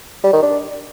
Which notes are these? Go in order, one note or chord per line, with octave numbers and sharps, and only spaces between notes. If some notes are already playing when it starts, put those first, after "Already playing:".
G3
D#3
D4